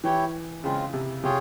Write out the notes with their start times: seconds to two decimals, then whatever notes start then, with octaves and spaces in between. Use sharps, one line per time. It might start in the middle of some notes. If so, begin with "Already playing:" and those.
0.04 E3 E4 G4 C#5 G5
0.64 C#3 G#3 C4 F4
0.93 C3
1.23 C3 F4 G#4 C#5 G5